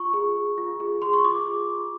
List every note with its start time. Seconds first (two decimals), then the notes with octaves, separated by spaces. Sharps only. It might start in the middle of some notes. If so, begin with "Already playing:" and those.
Already playing: F4 C#6
0.13 G#4
0.36 G#4
0.58 F4
0.80 G#4
1.02 G#4 C6
1.13 C#6
1.25 F4 D6
1.46 G#4
1.69 F4